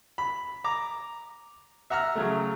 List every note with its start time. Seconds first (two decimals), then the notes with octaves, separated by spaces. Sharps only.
0.18 B5
0.64 A#5 D6
1.90 E5 F#5 A#5 E6 F6
2.15 C#3 F#3 A3